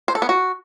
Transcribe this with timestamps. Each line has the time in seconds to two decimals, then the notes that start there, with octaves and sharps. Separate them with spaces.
0.08 C5
0.15 A4
0.22 B3
0.29 F#4